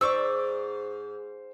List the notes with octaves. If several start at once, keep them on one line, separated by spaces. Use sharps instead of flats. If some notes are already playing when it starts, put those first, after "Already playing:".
G#2 C5 D5 C#6 E6